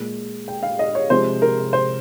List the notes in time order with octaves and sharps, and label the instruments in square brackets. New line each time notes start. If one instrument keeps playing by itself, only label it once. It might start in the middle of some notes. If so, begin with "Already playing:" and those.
Already playing: [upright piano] A#2 G#3
G5
F5
D#5
C#5
C3 F3 G#3 C5
A#4
C5